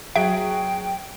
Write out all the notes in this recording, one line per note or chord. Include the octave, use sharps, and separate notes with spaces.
F#3 F#4 G#4 E5 G5 D7